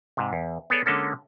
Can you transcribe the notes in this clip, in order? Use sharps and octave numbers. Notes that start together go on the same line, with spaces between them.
G#2 C3
E2
B3 G#4 A4 C#5 D5
D3 G#3 A#3 C#4 A4